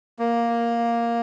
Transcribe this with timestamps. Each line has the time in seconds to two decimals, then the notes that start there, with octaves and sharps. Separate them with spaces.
0.19 A#3